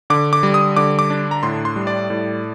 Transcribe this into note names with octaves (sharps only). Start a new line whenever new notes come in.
D3 D6
D6
G3
D#6
D3 D6
D6
D4
A#5
A2 C6
C6
G3
D5
A2